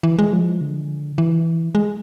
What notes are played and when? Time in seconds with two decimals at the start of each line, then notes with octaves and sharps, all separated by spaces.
0.03 E3
0.19 G#3
0.33 F3
0.61 D3
1.18 E3
1.75 G#3